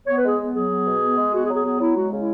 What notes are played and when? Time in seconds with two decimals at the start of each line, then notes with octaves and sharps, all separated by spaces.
0.06 B3 C#5
0.16 B4
0.22 G#3
0.28 G#4
0.38 B3
0.53 F#3 G#4
0.69 B3
0.86 B2
1.01 B3
1.16 G#3
1.32 B3 F#4
1.43 G#4
1.48 F#3
1.53 G#4
1.64 B3 G#4
1.79 F#3 E4
1.95 G#3 F#4
2.11 C#3
2.16 E4